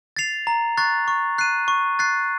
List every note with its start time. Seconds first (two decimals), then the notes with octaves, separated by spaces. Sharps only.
0.16 A6 C7 F7
0.47 A#5
0.77 C#6 F#6 A6 C7
1.08 C#6
1.38 F#6 C7 D#7
1.68 C#6
1.99 F#6 A6 C7